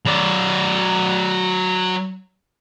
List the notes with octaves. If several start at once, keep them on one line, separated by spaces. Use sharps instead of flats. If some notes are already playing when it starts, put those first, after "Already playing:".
F#3 D5